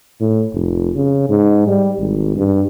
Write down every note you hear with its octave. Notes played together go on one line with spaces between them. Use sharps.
A2
F1
C#3
G#2
G3
G#1
G2